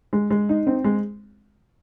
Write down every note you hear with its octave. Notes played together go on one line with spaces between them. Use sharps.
G#3
G#3
D#4
C4
G#3